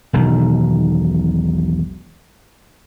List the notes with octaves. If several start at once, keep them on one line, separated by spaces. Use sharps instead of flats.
E1 B1 D#3